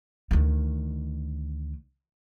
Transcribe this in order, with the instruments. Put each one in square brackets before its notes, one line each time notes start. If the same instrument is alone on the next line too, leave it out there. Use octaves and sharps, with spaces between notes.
[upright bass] D2 D#3